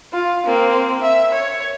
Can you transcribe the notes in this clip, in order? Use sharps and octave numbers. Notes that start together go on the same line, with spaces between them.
F4
A#3 C4
E5
C#5